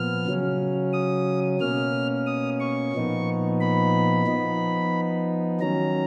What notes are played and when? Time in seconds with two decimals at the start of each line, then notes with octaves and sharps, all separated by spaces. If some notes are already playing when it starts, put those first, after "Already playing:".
Already playing: A#2 F3 B3 F6
0.26 C#3 F#3 C#4
0.93 D#6
1.60 B2 A#3 C#4 F6
2.26 D#6
2.60 C#6
2.93 A#2 F3 B3 D#4
3.60 B5
4.26 F3 B3 D#4
5.60 D#3 F#3 C#4 A#5